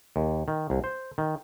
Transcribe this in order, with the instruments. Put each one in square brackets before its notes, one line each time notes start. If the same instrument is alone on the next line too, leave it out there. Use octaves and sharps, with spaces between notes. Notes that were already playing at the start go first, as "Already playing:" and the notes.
[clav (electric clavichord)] D#2
D#3
C2
C5
D#3